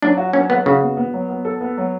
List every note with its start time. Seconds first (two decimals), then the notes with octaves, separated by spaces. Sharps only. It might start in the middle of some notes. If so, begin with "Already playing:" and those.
0.02 F#3 D4
0.17 F#4
0.33 F#3 C#4
0.50 B3 F#4
0.66 C#3 F#4
0.82 B3
0.97 B3
1.13 F#3
1.29 B3
1.45 A4
1.61 B3
1.77 F#3